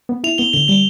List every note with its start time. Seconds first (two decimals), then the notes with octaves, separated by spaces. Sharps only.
0.09 B3
0.24 E4 F7
0.38 B3 G7
0.53 D3 G7
0.68 G3 G7